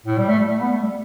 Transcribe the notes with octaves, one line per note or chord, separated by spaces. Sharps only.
A2
G3
A3
G3
A3
B3
A3
G3